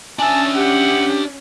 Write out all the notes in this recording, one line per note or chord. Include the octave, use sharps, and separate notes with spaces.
C#4 D4 E5 G#5 A5
G4 F#5